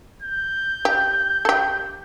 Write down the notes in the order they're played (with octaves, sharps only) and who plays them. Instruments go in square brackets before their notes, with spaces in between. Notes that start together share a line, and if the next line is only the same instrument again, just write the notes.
[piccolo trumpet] G6
[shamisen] G4
G4 A4